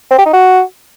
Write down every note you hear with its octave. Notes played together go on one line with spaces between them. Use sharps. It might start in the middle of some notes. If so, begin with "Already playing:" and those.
C4
G4
D#4
F#4